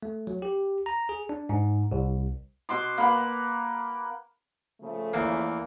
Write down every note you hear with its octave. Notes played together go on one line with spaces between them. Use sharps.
A3
F#3
G4
A#5
G#4
D4
G#2
C2
B2 C6 D6
A#3 B4 F#5
C#3 F3 A3
E2 A#3